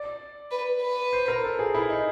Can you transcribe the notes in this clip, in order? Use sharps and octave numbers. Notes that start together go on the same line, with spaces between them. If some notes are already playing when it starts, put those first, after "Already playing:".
Already playing: D5
B4
B4
C5
A#4
A4
G#4
E4
D#4